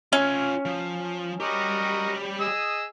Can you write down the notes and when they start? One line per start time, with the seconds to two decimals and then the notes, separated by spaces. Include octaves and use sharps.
0.13 C#4 F4 G#5
0.65 F3
1.40 G3 F#4 G4 A#4 D#5
2.40 G#4 D#5 E6